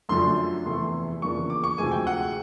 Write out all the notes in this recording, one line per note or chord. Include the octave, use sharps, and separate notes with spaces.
F#2 D3 F3 A3 D4 C6
E2 C3 E3 A3 C6
E2 C#3 F3 A#3 D4 C#6
D6
C#6
D2 C3 F3 G#3 G#5
G5
F#5